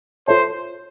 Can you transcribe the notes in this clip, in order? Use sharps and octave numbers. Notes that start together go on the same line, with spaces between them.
F4 A4 C5 C#5 E5 A5